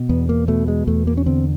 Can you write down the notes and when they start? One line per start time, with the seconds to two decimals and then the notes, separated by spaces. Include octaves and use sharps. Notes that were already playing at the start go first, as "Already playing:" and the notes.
Already playing: B2
0.09 E2 B3
0.29 A#3
0.48 B2 A3
0.68 G#3
0.87 E2 A3
1.07 A#3
1.17 C#4
1.26 D3 C4